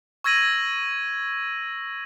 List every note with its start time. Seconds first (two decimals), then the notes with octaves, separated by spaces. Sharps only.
0.24 C#6 E6 G#6 A#6 D#7 F#7